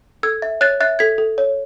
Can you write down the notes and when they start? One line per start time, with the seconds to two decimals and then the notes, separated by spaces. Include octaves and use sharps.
0.23 A4 E6 G#6
0.42 E5
0.61 C#5 F#6 A6
0.80 E5 F#6 A6
0.99 A4 G#6 B6
1.18 A4
1.38 C#5